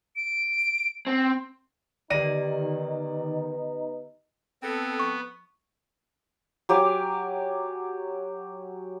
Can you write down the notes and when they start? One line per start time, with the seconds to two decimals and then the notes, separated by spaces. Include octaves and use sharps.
0.16 D7
1.07 C4
2.10 D3 D#3 B3 D#4 G4 D5 A#6 D#7
4.63 B3 C4 A4
4.99 C#6
6.69 F#3 G4 G#5 D6